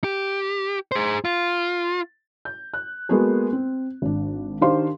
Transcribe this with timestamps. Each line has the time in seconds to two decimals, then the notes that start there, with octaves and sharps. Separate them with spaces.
0.04 G4
0.92 G#4 C5
1.25 F4
2.45 G6
2.74 F#6
3.09 G#3 A#3 B3 F#4 G#4 A4
3.53 C4
4.02 G#1 D4
4.61 D#3 D4 G4 C5 F5 C6